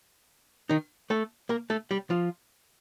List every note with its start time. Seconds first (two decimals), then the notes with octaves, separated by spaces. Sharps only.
0.69 D#3 D#4
1.10 A3 A4
1.49 A#3 A#4
1.70 A3 A4
1.91 G3 G4
2.10 F3 F4